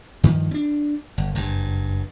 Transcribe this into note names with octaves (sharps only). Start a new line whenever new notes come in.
G2 D#3 F3
C4 D4
G1
F#1 G2